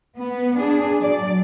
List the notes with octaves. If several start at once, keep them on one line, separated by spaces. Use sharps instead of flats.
B3
D4 G#4
F#3 D5